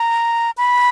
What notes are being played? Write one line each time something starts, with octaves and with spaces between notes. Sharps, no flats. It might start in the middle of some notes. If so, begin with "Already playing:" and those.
Already playing: A#5
B5